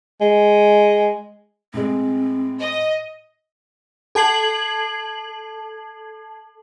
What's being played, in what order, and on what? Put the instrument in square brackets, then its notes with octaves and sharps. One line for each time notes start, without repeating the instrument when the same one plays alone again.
[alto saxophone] G#3
[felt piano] A2 G#3 [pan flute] C4
[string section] D#5
[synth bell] A4 A5 G#6 C7 F#7